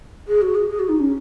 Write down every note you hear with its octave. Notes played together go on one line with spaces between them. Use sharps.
G#4
F#4
G#4
G#4
F#4
D#4
C#4